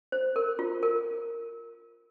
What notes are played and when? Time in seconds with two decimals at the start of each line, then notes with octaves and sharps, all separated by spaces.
0.12 C5
0.36 A#4
0.59 F4
0.83 A#4